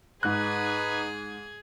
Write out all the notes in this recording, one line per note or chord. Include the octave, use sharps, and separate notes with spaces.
G#2 D#4 G#4 B4 F#6 G#6